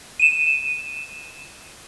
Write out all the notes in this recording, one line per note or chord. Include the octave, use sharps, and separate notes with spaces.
D#7 E7